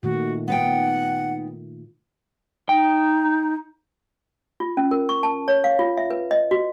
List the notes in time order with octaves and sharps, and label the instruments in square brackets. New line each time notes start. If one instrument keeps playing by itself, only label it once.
[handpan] A#2 D#3 A3 [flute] F#4
[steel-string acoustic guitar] B3 D#4 G5 [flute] F#5
[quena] D#4 [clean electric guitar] G5
[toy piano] F4
C#4
A#4
C#6
A5
C#5
F5
F4
E5
B4
D#5
F#4